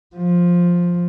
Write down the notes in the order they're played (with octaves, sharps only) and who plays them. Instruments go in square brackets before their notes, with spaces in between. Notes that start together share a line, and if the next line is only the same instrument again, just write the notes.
[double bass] F3